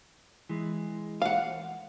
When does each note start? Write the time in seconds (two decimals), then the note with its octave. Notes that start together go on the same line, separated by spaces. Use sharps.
0.49 E3 G#3
1.22 F5 F#5